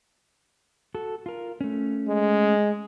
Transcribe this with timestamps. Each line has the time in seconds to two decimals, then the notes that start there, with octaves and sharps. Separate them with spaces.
0.94 F#4 A4
1.26 F4 A#4
1.61 A3 C#4
2.08 G#3